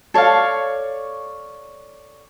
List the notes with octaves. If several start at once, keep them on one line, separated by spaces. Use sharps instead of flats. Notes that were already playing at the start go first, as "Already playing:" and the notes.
A4 C#5 D5 F5